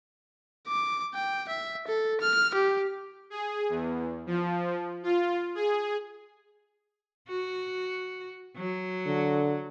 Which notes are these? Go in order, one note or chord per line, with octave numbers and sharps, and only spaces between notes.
D6
G5
E5
A4
F6
G4
G#4
E2
F3
F4
G#4
F#4
F#3
D3